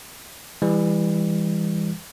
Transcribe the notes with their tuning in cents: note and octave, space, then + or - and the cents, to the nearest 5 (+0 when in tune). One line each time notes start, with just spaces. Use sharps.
E3 +0 G3 +35